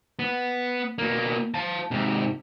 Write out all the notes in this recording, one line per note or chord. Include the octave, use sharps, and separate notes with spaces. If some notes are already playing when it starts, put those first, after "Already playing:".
B3
B2 A#3
F5 A5
G#2 C3